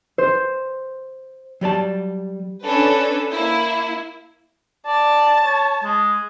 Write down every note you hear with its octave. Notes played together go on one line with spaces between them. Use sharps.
C5
F#3 G3 D5 A5
C#4 D4 A4 B4
A#3 E4
D5 A5
C#5
G#3